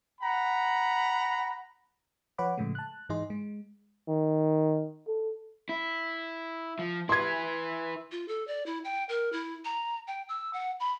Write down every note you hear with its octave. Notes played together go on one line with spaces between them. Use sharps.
F#5 A#5 B5
F3 B4 C#5 F#5 B5 D6
A2 C#3 F3 G#3 A3
A5 F#6
G#2 E3 D#4 G#4 D#5 C6
G#3
D#3
A4
E4
F3
E4 B4 C6 G#6
F4
A4
D5
E4
G5
A#4
E4
A#5
G5
E6
F#5
B5